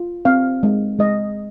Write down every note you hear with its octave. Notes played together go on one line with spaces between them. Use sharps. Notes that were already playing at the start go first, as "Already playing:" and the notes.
Already playing: F4
C4 F5
G#3
G#3 D#5